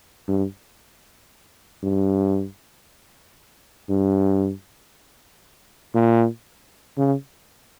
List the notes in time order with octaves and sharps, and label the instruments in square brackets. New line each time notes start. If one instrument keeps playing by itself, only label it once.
[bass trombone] G2
G2
G2
A#2
C#3